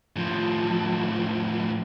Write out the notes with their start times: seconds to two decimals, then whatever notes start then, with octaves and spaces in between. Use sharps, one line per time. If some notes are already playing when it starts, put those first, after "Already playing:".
0.16 A2 F3